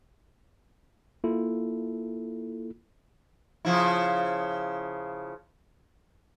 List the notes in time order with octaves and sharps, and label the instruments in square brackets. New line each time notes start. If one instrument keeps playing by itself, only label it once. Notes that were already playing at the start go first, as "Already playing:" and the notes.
[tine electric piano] A#3 E4 F4 A4
[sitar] C#3 F3 E4